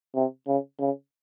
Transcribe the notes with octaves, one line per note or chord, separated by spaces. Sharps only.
C3
C#3
C#3